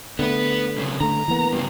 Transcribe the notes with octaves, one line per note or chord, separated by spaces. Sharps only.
D3 A3 B3 B4
B1 C#3
D3 A3 A#5
E3 A#3 B3
G2 C#3